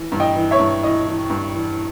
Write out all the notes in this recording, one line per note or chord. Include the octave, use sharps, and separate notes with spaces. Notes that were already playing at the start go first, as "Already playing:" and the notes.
Already playing: E3
G2
D#5 G5
E3
C#5 E5
G2
E3 D#5
E3
G2
E3